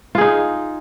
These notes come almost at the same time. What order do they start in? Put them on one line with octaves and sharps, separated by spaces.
F4 G#4 D#4